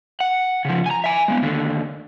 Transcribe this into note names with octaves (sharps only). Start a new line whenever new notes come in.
F#5
C#3 F3
G#5 A#5
E5 G#5
G#3 B3
D#2 D3